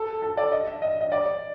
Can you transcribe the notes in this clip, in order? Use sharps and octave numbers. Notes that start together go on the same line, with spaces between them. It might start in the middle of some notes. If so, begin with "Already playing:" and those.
Already playing: A4
A4
D5
D#5
E5
D#5
D#5
D5